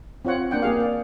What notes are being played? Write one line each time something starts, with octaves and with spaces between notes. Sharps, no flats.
C4 F4 C#5 F#5
A#3 D4 F#5 G5
A#3 G4 G#4 F5
D5